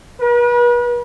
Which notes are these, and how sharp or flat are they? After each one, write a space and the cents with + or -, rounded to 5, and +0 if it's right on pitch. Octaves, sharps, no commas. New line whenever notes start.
B4 -40